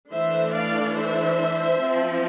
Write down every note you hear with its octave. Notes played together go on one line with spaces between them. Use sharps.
E3 A3 D4 C5 E5
D5 F5
C5 E5
F3 C4